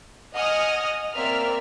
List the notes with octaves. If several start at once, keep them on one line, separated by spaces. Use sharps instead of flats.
D#5 F#5 G#5 D#6 F6
A#3 C4 D5 E5 F6